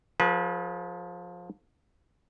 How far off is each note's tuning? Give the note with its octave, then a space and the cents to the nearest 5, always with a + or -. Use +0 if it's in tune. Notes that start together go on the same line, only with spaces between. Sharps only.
F3 +20 G#4 +45 B4 -25